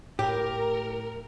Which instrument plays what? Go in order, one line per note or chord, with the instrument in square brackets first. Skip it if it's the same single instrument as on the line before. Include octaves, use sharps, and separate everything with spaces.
[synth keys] A2 [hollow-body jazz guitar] G4 [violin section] A#4